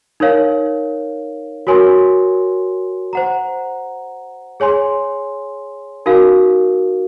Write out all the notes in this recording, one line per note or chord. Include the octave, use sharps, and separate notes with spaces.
D#4 A#4 C#5 F5
F#4 A#4 C#5 G#5 C6
C5 F#5 A#5
G#4 C#5 G#5 C6
D#4 F#4 A#4 F5